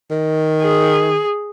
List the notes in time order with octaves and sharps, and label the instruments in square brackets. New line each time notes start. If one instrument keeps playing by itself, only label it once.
[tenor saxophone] D#3
[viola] G#4